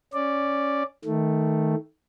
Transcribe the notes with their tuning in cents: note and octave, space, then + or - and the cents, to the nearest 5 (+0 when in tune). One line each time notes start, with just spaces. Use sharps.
C#4 +0 D5 +0
D#3 +15 A3 +0